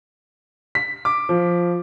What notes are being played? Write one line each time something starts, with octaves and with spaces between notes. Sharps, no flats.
B6
D6
F3